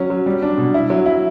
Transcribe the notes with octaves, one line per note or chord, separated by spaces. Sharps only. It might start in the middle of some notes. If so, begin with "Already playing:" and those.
Already playing: F#3 C#4
F#3
G3
D4
B2
E4
F#3
E4